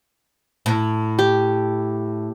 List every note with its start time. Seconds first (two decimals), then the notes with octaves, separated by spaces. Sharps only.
0.66 A2
1.19 G4